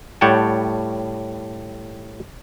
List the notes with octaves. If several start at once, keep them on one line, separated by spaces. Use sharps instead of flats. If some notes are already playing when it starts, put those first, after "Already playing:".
A2 G3 C#5 F#5 G5 A5